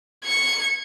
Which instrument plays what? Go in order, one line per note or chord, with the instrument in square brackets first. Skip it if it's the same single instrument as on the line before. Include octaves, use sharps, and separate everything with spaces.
[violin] G#6 C#7